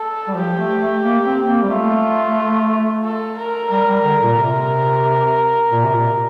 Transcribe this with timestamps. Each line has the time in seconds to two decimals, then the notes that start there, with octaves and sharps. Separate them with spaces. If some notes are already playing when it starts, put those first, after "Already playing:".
Already playing: A4
0.28 G3
0.35 F3 G4
0.57 A3
0.80 A3
1.02 A#3
1.24 C4
1.46 A#3
1.63 G3
1.69 A3 F4
3.04 A4
3.37 A#4
3.70 G3 A#4
3.87 G3
4.04 D3
4.21 A#2
4.37 C3 A#4
5.72 A#2
5.84 C3
5.94 A#2